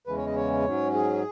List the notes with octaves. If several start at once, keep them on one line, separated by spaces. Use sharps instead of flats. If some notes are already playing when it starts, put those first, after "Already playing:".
E2 C#3 E3 G#3 C#4 B4
C#5
D#5
C#5
G#2 F#3 C#4
G#4